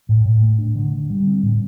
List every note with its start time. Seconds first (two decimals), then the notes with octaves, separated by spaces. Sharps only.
0.09 A2
0.26 A2
0.42 A3
0.59 D4
0.76 D3
0.92 D3
1.10 G3
1.27 C4
1.43 A2